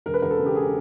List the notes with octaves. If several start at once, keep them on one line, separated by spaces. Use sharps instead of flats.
E1 A#4
B4
E1 A#4
A4
C#3
G4
G#4